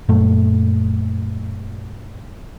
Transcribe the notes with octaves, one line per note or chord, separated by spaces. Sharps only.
F#2 A#2 A3